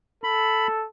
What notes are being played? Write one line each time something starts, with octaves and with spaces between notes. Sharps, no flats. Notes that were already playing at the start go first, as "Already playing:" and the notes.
A4 B5